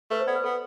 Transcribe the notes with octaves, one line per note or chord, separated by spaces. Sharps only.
A3 B4
C5
B3 D5
B4
B3 A4